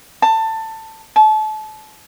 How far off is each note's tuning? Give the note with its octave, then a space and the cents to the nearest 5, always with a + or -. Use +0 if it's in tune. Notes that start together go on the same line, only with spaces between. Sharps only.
A5 +20
A5 -30